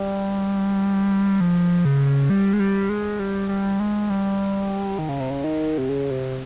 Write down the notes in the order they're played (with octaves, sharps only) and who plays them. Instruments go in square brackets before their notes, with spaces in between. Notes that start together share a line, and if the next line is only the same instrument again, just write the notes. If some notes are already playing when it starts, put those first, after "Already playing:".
Already playing: [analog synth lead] G3
F3
C#3
G3
G#3
G3
G#3
G3
G3
G#3
G3
D#3
C#3
C3
C#3
D#3
C3
C#3
C3